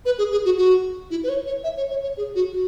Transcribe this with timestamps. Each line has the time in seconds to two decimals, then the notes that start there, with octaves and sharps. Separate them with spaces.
0.05 B4
0.18 G#4
0.32 G#4
0.45 F#4
0.58 F#4
1.11 E4
1.24 B4
1.29 C#5
1.46 C#5
1.64 E5
1.77 C#5
1.90 C#5
2.03 C#5
2.17 G#4
2.35 F#4
2.52 F#4